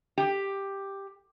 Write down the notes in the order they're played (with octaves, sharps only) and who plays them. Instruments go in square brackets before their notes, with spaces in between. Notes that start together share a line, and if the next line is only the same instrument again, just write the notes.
[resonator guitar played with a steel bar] G4